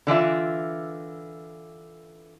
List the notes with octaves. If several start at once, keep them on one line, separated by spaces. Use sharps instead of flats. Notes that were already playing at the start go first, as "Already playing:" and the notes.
D3 E3 F4 E5